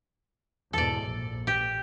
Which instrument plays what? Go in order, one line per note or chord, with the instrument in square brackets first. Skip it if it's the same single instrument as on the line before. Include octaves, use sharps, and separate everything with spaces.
[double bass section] E2 G#2 B2 [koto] A4 D5
[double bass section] A#1
[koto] G4